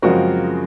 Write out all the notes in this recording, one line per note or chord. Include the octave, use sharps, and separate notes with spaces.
F#2 C#3 F3 G#3 C4 F#4 A#4